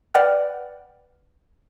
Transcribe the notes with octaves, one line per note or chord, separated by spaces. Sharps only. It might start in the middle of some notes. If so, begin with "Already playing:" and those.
B4 D5 F#5 G5 F6